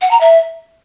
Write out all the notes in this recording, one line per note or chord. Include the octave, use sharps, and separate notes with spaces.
F#5
A#5
E5